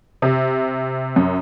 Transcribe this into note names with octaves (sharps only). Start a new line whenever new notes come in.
C3
F#2